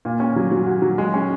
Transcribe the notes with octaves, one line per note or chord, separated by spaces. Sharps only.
A#2
C#4
F#3
F#3
F#4
F#3
G#3
C#4